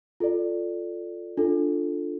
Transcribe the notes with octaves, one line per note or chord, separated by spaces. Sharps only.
F4 A4 D5
D4 F4 A4